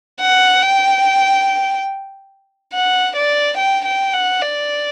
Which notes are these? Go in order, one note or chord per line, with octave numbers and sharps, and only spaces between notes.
F#5
G5
F#5
D5
G5
G5
F#5
D5